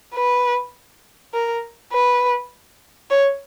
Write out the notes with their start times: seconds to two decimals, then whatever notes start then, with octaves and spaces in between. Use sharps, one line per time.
0.15 B4
1.34 A#4
1.93 B4
3.11 C#5